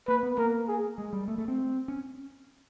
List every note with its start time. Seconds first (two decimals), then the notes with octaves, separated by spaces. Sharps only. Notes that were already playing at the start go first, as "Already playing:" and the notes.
0.08 A#3 B4
0.23 B3
0.38 A#3 A#4
0.68 G#4
0.98 G#3
1.13 G3
1.28 A3
1.38 A3
1.48 C4
1.88 C#4